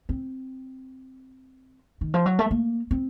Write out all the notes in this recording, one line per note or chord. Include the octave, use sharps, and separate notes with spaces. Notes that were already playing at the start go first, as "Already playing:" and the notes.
C4
D#3
F3
F#3
A3
A#3
C4